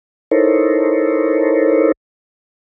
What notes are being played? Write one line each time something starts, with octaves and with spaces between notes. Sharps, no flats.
D#4 E4 A4 A#4 C5 C#5